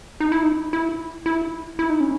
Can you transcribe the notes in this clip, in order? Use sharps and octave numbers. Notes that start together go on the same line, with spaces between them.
D#4
E4
D#4
E4
E4
E4
D#4
C#4